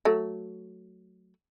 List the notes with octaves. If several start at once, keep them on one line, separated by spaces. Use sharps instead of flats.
F#3 A3